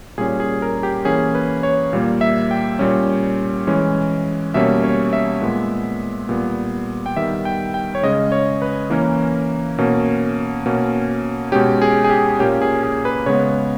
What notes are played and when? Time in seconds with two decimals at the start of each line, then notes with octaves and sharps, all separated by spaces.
0.18 A#2 G3 C#4 G#4
0.40 G#4
0.62 A#4
0.83 G4
1.05 E3 A#3 C#4 G#4
1.35 B4
1.63 C#5
1.93 A#2 G3 A#3
2.21 E5
2.51 G5
2.79 A#2 G3 C#4
3.67 E3 G#3 C#4
4.54 B2 G3 A#3 C#4 E5
4.84 C#5
5.13 E5
5.42 A#2 G#3 B3
6.29 A#2 G3 B3
7.06 G5
7.17 D#3 G3 B3 E5
7.45 G5
7.74 G5
7.95 C#5
8.03 C#3 G#3 C#4 D#5
8.32 C#5
8.62 B4
8.90 E3 A#3 C#4 A#4
9.78 B2 A#3 C#4
10.66 B2 A#3 C#4
11.52 B2 G#3 C#4 G4
11.82 G#4
12.04 G#4
12.10 G4
12.39 A#2 A#3 C#4 G4
12.61 G#4
12.83 G#4
13.05 B4
13.26 C#3 G#3 B3 C#5